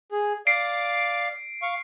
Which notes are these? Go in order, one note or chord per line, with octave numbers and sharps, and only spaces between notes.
G#4
D5 F5 C7 D7
F5 C#6